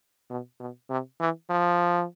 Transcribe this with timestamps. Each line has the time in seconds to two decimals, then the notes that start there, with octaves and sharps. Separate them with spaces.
0.30 B2
0.60 B2
0.90 C3
1.20 E3
1.50 F3